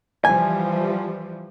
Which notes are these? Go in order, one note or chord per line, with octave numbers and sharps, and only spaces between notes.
E3 F3 G3 G#5